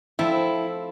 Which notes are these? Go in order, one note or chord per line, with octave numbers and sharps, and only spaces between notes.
F3 A3 C4 E4